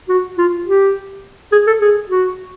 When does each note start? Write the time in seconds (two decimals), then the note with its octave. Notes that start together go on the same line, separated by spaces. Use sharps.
0.09 F#4
0.38 F4
0.66 G4
1.52 G#4
1.67 A4
1.81 G#4
2.09 F#4